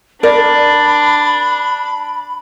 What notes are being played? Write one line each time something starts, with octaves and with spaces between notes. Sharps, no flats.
D4 A#4 D5 B5